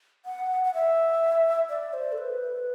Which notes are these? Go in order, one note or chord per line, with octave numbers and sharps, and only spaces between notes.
F#5
F#5
E5
D5
C5
A4
B4